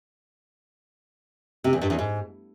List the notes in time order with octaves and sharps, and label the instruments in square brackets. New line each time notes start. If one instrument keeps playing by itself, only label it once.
[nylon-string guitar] C3
E2
G2
E2
G#2